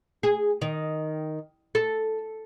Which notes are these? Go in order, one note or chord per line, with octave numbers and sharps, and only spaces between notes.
G#4
D#3
A4